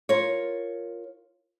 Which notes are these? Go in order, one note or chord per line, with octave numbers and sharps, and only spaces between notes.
F4 A#4 C#5